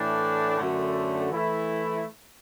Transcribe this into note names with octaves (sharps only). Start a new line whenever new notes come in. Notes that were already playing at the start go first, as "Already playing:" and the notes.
Already playing: A2 E3 A3 D4
F#2 D3 A3
E3 A3 E4